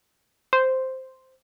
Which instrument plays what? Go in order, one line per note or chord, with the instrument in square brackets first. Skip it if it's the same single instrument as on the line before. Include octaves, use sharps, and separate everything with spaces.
[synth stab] C5